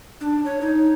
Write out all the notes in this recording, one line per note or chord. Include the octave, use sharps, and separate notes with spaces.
D4
C#5
D#4